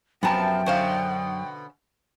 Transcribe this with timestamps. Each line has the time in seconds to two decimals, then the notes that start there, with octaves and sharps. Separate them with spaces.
0.23 F#2 C3 F3 B3 C4 G5 A5 A#5
0.66 B2 D3 C#4 C5 F5